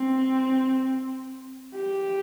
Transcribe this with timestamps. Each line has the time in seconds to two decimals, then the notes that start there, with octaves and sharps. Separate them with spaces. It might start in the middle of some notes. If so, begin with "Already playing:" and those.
Already playing: C4
1.75 G4